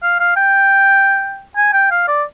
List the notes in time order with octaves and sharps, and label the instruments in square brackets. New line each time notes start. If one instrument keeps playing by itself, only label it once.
[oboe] F5
F5
G5
G#5
G5
F5
D5